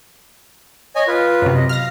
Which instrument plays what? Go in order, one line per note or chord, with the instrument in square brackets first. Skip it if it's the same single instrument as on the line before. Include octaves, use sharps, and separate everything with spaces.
[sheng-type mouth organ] C#5 D#5 G#5
F4 B4
[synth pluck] F#2 C3
[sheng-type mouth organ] D#5
[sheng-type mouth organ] F5 [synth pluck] F6 A#6